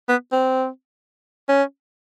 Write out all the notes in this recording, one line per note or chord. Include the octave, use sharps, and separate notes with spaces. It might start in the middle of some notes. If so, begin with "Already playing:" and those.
B3
C4
C#4